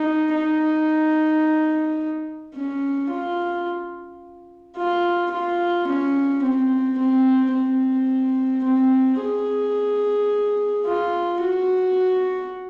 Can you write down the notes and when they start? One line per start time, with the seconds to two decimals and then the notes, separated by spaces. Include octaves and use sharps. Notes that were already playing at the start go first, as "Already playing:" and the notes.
Already playing: D#4
0.34 D#4
2.55 C#4
3.10 F4
4.77 F4
5.31 F4
5.87 C#4
6.43 C4
6.98 C4
7.53 C4
8.64 C4
9.20 G#4
10.86 F4
11.41 F#4